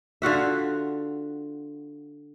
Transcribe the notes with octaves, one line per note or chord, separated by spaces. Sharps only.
D3 F4 F#4 E5